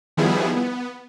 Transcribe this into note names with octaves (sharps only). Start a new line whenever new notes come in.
D#3 F3 G3 B3 E4 G#4
B3